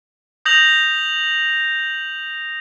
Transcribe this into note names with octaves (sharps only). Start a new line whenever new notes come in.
D#6 G6 A#6 F7 F#7